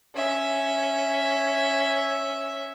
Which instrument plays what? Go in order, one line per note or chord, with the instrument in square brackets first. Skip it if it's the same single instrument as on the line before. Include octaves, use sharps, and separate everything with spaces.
[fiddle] C#4 E5